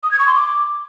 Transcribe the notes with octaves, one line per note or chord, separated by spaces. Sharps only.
D#6
G#6
C#6
C6
D6